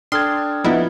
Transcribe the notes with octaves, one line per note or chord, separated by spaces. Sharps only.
D4 A4 G5 C6 D#6 F6 G#6
F3 B3 D#4 E4